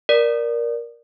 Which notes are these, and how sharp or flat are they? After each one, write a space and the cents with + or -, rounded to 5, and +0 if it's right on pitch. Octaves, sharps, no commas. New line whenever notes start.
A#4 +15 D5 +0